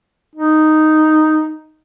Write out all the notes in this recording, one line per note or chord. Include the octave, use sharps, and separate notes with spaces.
D#4